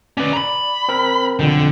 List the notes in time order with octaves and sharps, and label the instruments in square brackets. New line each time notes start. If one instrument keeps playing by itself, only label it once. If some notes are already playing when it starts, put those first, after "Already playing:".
[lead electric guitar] C#4 B4 [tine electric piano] D5
[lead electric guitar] A#5 B5
[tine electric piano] C4 A#4
[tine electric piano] B1 F2 G5 [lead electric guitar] D3